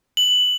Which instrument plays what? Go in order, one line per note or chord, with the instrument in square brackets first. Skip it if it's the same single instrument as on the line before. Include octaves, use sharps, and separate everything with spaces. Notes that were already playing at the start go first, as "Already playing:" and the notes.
[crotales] F#7